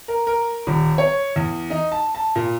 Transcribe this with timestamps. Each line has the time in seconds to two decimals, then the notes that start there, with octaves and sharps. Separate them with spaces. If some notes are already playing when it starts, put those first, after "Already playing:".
0.08 A#4
0.27 A#4
0.67 D#1
0.98 C#5
1.36 E2
1.70 D#4
1.92 A5
2.15 A5
2.35 A#2